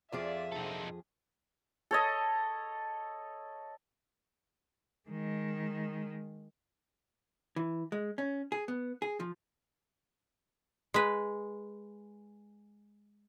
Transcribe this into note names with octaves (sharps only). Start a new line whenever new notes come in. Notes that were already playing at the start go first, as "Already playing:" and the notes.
F2 F3 G#4 D5 E5
A#1 C4 D#4 A4
A4 C#5 D#5
D#3 G#3
E3
G#3
C#4
G#4
B3
G#4
F3
G#3 B4